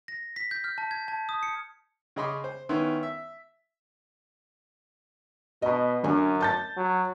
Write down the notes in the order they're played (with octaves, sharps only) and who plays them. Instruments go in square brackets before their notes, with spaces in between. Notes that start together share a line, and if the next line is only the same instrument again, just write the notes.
[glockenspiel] A#6
B6
G6
F6
A5
G#6
A5
D#6
C#7
[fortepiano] C#3 G#4 D#5 B5 C6 D6
C5
D#3 B3 C#4 E4 C6
E5
[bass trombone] B2 [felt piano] D#5 B5
[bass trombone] F#2 [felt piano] D3 G#5
[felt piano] A5 G6 A6
[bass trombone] F#3